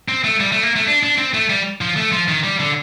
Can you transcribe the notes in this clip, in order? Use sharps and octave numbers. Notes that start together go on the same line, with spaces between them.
C4
A3
G3
A3
A#3
A3
D4
D4
C4
A3
G3
F3
A3
F3
D#3
G3
D3